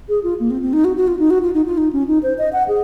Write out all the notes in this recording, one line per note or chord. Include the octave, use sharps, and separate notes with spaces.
G#4
F4
A#3
C4
C4
D#4
F#4
F#4
F4
D#4
F#4
F4
D#4
F4
D#4
C#4
D#4
C5
D#5
F#5
G#4